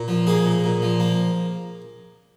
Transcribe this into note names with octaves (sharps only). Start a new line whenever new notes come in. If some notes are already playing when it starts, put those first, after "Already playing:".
Already playing: A#2
F3
A#3 G#4
A#2
A#2
F3
A#3